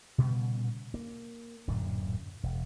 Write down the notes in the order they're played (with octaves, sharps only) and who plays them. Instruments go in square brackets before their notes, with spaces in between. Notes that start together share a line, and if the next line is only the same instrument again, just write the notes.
[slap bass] A#2 C#3 G3 B3
A#3
D1 F#2 A#2 D3
E1